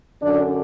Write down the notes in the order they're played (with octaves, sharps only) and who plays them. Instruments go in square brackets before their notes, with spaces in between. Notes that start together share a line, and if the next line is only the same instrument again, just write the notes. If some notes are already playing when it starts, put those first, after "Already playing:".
[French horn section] F#2 D3 D4